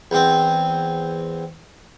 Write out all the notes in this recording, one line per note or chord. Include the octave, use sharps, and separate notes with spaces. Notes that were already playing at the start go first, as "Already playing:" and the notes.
E2 C4